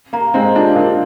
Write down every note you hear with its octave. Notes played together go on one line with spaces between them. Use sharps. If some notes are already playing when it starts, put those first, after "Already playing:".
A#3 A#5
G#3 C4 A#5
A#3 D4 F4
A#3 D4 A#4